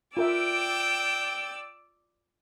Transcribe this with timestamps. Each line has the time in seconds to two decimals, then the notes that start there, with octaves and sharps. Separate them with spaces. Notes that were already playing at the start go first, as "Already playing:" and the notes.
0.17 F4 A#4 D5 E5 G5 D6 E6